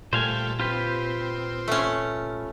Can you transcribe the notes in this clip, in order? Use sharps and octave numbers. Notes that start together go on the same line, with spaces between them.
A#2 G3 A3 C5 F5 G#5
C4 F4 G4 B4
A3 C#4